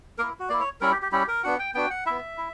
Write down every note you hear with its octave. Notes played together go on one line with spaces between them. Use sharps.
A#3 E4 A#4
F#4
A#3 E4 D5
C#5
G3 C#4 E4 A#4
G4
G4
G3 C#4 E4 G4
A#4
B3 D4 F#4 F#5
G5
B3 D4 F#4 G5
F#5
B3 E4 E5
E4